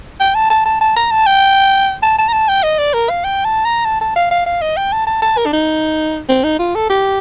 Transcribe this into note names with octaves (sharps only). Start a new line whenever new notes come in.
G5
A5
A5
A5
A5
A#5
A5
G5
A5
A5
A#5
A5
G5
D#5
D5
A#4
F5
G5
A5
A#5
A5
A5
F5
F5
F5
D#5
G5
A5
A5
A5
A#4
D4
D#4
C4
D#4
F4
A4
G4